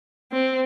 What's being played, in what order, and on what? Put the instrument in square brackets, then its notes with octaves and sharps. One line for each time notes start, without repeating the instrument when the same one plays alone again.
[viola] C4